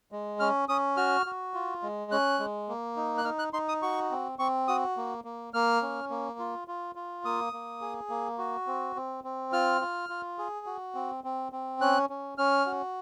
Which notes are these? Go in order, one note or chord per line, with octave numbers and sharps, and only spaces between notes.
G#3
C#4 F6
C#4 D#6
F#4 F6
F#4
F4
G#3
C#4 F#6
G#3
A#3
D#4
F#6
D#4 F6
F#6
D#4 C6
D#6
F#4 C#6
C4
C4 C#6
F#4 D#6
A#3
A#3
A#3 F6
C#4
A#3
F4
F4
F4
A#3 D#6
A#3
G#4
A#3
F#4
C4
C4
C4
F4 F6
F4
F4
G#4
F#4
C4
C4
C4
C#4 F#6
C#4
C#4 F6
F#4